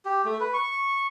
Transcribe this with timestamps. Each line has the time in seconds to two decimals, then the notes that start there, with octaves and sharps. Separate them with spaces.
0.05 G4
0.25 A3
0.40 B4
0.54 C#6